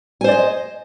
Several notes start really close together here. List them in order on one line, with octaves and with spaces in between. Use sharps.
G#5 C5 D5 D#5